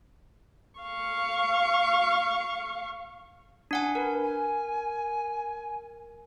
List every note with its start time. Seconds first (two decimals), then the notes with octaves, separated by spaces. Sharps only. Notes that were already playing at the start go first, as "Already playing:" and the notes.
0.80 F5 C#6
3.71 D4 F#5 G#5
3.95 A#4 B4
4.23 G#5